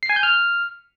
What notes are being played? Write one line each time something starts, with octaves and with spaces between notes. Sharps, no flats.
C7
G#5
G6
F6